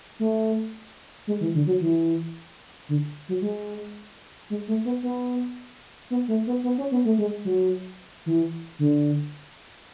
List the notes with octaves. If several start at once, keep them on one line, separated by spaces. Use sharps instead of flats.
A3
G#3
E3
D3
F#3
E3
D3
F#3
G#3
G#3
A3
B3
B3
B3
A3
B3
B3
C#4
B3
A3
G#3
F#3
E3
D3